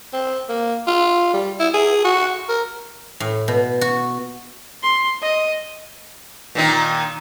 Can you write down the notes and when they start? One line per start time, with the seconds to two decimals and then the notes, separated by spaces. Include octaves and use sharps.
0.13 C4
0.49 A#3
0.87 F4
1.34 G3
1.60 E4
1.74 G#4
2.04 F#4
2.49 A#4
3.20 A2
3.48 B2
3.81 F#4
4.82 C6
5.22 D#5
6.55 A#2 D#3 D#4